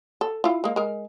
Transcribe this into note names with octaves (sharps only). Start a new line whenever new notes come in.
A4
E4 F4
G#3 A#3
G#3 A#4